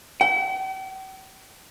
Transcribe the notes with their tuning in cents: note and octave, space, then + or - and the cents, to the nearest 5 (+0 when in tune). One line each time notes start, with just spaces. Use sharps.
G5 -45